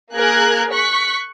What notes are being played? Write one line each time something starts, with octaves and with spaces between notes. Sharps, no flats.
A#3 G#4 A#4 F#6 G#6
C#6 F#6 B6